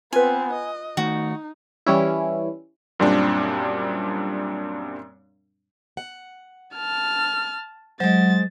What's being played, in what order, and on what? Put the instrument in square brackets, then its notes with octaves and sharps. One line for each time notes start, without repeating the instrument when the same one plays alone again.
[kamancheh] B3 C4 [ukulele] F4 B4 [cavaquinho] G#5
[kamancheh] D#5
[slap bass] D#3 A3 [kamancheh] D#4 [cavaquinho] F#4
[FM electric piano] E3 G3 C#4 E4
[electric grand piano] F#2 A#2 G3 C4 D4
[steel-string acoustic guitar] F#5
[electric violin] A5 F6
[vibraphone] F#3 [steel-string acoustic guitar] G#3 C5 [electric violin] A6